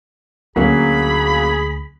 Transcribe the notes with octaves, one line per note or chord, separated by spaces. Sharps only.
D2 D3 F#3 A#3 C#4 G#4 B5